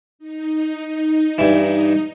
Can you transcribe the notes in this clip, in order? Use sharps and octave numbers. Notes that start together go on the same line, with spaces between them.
D#4
G2 E3